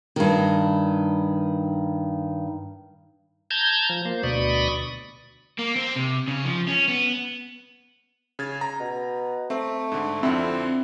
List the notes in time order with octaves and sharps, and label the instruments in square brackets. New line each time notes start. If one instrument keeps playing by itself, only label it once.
[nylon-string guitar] G2 D#3
[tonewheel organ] A5 A#5 G6 G#6
F3
A#3 C5
D2 B2 D5 B5 C#6 D#6
[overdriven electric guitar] A#3
C4
C3
C#3
F3
C#4
B3
[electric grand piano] C#3 G#6 A6
A#5
[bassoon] B2
[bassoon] A3 [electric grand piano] C4
[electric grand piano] G#2 D3
[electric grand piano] F2 D3 [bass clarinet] C4 [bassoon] E4